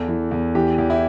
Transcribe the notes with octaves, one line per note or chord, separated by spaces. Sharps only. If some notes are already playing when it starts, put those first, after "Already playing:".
Already playing: E2 A4
E3
E2
E3 G4
E2
E4